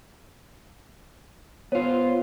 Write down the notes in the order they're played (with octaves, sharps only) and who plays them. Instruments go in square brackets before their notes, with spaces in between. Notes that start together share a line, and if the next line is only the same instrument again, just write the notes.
[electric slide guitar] B3 F4 [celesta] C5 C#5